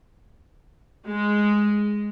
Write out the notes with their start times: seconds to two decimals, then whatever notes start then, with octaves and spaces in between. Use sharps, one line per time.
1.07 G#3